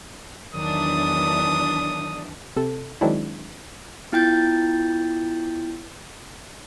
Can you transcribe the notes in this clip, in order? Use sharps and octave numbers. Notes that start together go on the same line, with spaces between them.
E2 D#3 E3 F#3 D4 D#6
C3 A4
D#3 F#3 G#3 C4 D4 E4
B3 E4 F4 G5 G6 A6